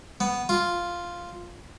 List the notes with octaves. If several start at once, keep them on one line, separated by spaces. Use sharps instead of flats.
B3
F4